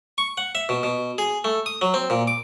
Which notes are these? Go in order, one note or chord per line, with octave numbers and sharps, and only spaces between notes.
C#6
F#5
E5
B2
B2
G#4
A3
D#6
F#3
C4
A#2
D6